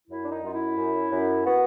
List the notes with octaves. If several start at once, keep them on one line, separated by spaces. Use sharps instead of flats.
F#2 E4
D4
D#4
F#2 F4
E4
F#2
F#2
B3 F#4